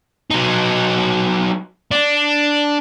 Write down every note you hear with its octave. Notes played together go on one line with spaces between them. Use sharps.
F#3 D#4
D4